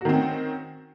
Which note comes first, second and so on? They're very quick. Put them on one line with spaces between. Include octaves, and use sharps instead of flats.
F#4 D#3 C4 C#4